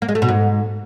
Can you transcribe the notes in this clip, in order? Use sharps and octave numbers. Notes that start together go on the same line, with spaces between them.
A#3
G#3
A3
B2
G#2